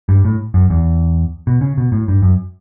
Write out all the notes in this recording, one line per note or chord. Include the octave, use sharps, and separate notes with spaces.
G2
A2
F#2
E2
B2
C#3
B2
A2
G2
F#2